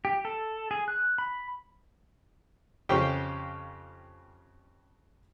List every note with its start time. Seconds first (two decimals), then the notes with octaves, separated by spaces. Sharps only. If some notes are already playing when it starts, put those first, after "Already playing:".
0.05 G4
0.25 A4
0.71 G#4
0.88 F#6
1.18 B5
2.89 F2 C#3 C#4 G4 C5 G5